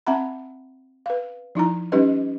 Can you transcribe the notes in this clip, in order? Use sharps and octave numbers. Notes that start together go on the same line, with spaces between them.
C4 E5 F#5 A#5 B5
B4 F5
F3 D#4 E4 A#5
G3 C#4 D#4 G4 B4 D#5